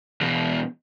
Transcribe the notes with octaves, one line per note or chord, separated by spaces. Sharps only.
E2 B2